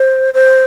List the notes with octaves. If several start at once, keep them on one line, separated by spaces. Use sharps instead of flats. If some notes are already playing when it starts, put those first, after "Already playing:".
Already playing: C5
C5